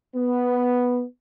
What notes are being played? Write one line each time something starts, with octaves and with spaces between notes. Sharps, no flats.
B3